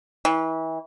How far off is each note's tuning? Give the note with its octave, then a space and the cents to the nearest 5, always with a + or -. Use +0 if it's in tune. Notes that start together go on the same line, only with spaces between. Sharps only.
E3 -30